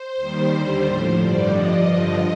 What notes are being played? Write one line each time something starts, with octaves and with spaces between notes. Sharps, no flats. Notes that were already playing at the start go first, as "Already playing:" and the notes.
Already playing: C5
D#2 D#3 G3
D#2 D3 G3
A2 F3
G2 D3 G3 D5
G2 F3 D#5
G2 D3 F3